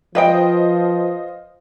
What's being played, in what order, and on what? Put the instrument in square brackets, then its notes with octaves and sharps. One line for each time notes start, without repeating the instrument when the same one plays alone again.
[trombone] F3 [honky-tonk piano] F4 C5 D#5 [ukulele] B4 G5